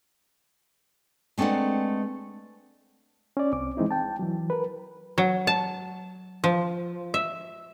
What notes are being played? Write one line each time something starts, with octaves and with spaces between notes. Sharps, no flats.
G#3 A3 C4 D4 B4 F#5
C#4 D5
C2 C4 D6
E3 G#3 C4 D#4 E4
G5 A5
E3 F#3
A#4 B4
F#3
A5
F3
E5